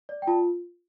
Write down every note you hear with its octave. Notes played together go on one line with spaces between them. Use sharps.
D5
G5
F4 A5